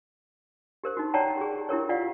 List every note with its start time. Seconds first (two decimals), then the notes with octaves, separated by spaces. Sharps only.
0.84 G4 A#4 C5
0.97 D#4 F#4
1.14 C#5 D5 F#5 G5 A5 A#5
1.37 G4 G#4
1.69 E4 G4 A#4 C#5
1.89 F4 D5 F5 F#5